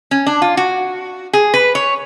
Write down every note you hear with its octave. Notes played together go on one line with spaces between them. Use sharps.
C#4
D4
F4
F#4
G#4
B4
C#5